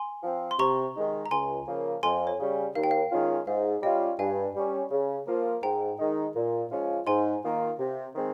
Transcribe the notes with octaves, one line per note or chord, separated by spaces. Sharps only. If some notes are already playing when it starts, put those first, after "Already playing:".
Already playing: G#5 C6
F3 C4
C6
C3 A#5 C#6
D#3 G#3 D#4
A#5
C#2 G#5 C6
C#3 F3 A#3
F2 G#5 C6
C#5
C#3 G3 C#4
D#2 F5
G5
F5
D#3 G#3 C#4 F4
G#2 F5
G3 C#4 F4 D#5 G5
G2 F5 G#5
G3 C#4
C#3
F3 A#3 F4
G#2 G5 A#5
D#3 G#3 D#4
A#2
F3 G#3 C#4 F4
G#2 G#5 C6
D#3 A#3 F4
C3
D#3 G#3 C4